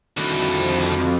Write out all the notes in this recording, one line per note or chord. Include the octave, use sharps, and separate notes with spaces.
C2 F2 D3 D#3 A3 F#4 A5 B5